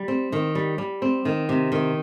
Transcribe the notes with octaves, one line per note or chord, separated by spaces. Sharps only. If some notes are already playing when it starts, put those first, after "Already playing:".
Already playing: G3
C4
D#3
G3
G3
C4
D#3
C3
D#3